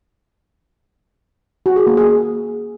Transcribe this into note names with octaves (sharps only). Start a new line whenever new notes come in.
F#4
G#4
A#3
G#4